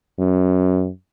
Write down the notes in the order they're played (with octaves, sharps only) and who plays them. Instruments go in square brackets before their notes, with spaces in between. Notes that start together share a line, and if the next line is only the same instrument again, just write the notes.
[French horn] F#2